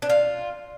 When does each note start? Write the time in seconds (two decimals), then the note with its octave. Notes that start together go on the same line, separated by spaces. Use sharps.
0.02 D4
0.09 F4